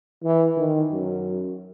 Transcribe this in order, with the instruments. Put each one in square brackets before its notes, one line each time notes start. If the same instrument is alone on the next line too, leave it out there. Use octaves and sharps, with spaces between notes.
[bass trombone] E3
D#3
F#2